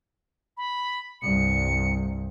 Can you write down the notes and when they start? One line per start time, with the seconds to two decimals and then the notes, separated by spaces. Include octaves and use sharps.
0.57 B5
1.22 C2 G2 C#7